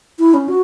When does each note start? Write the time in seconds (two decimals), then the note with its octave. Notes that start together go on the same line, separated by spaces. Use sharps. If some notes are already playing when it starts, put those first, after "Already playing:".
0.19 E4
0.34 C#4
0.48 F#4